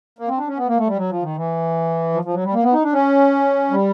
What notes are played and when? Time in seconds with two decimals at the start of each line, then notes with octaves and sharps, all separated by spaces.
0.19 A#3
0.28 C4
0.38 D4
0.48 C#4
0.57 B3
0.68 A#3
0.78 A3
0.87 G3
0.97 F#3
1.10 F3
1.23 D#3
1.36 E3
2.14 F3
2.25 F3
2.34 F#3
2.44 G3
2.54 A#3
2.64 B3
2.73 D#4
2.83 D4
2.93 C#4
3.71 G3